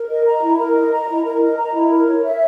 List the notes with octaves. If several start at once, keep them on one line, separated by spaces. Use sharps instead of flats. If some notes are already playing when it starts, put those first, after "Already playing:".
Already playing: A#4
D#5
A#5
E4
A#4
D#5
A#5
E4
A#4
D#5
A#5
E4
A#4
C#5
E5